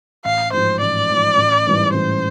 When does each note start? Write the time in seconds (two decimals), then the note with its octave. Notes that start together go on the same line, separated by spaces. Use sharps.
0.25 A1 F5
0.53 G#2 F3 C5
0.81 A1 D5
1.10 G#2 F3
1.37 A1
1.66 G#2 E3 G3
1.94 A1 C5